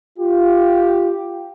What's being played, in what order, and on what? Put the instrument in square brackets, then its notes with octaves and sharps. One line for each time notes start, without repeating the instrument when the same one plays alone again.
[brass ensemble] F4 G4